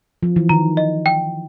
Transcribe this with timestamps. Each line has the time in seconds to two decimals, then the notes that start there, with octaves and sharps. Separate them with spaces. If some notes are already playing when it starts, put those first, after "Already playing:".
0.23 F3
0.36 E3
0.49 D#3 A#5
0.77 D#5
1.06 G5